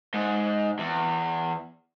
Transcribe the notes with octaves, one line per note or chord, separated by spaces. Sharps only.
G#2
E2